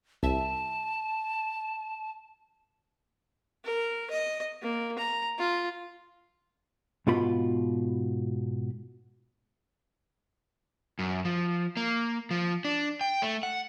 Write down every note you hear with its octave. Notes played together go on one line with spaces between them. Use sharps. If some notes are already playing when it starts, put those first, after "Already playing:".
C2 E5 A5
A#4
D#5
A#3
A#5
F4
G#2 B2 F4 B5
F#2
F3
A#3
F3
D4
G5
A3
F#5